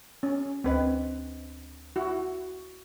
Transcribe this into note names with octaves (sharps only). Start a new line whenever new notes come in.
C#4
D2 C4 B4 D#5
E4 F#4